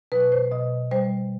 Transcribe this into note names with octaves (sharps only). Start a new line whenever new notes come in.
B2 F#3 B4
C5
B2 D#5
G3 C5